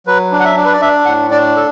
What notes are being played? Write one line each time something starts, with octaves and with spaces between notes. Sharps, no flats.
F#3 B4
D4
F#5
E5
D4
B4
D5
D4 E5
A2 F#5
D4 D5
A4